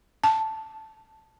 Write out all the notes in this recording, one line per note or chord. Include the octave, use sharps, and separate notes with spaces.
A5